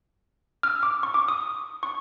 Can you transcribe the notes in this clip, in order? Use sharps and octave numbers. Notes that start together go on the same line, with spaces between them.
F6
E6
D6
C#6
D6
D#6
C#6